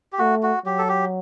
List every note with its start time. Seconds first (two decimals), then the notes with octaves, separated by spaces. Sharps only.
0.13 G4
0.19 A3 F#4
0.43 F#4
0.66 F#3 G4
0.78 A4
0.89 G4